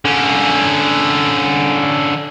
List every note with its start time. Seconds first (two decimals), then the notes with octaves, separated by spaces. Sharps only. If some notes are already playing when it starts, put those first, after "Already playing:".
0.05 D3 C#4